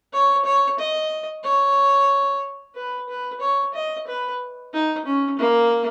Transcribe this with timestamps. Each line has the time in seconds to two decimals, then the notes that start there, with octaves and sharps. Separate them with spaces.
0.13 C#5
0.45 C#5
0.79 D#5
1.44 C#5
2.75 B4
3.09 B4
3.41 C#5
3.74 D#5
4.07 B4
4.73 D#4
5.05 C#4
5.39 A#3